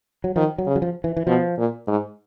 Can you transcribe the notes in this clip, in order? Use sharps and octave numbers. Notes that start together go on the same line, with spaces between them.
F#3
D#3 F3
F#3
C#3
F#3
F3
E3
E3
B2 F3
A#2
G#2